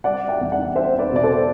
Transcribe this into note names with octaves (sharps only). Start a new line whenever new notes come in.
G3 D5 F#5
E5 G5
E2
D5 F#5
C4 C5 E5
B4 D5
B2 D5
A4 C5